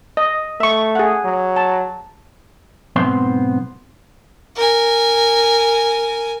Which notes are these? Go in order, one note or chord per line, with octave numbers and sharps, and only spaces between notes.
D#5
A3 E5 C#6
G#4 F#5
F#3
A5
B1 G#2 B3 C4 C5
A#4 G#5